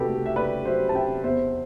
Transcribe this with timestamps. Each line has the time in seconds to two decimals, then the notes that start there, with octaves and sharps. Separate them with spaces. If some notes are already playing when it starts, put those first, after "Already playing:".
Already playing: C2 C3 F#4 G4 A4 B4
0.08 A3
0.26 E5
0.36 A3 B4 D5
0.65 F#3 C5 E5
0.89 A5
0.95 C3 E5 G5
1.24 E2 C5 E5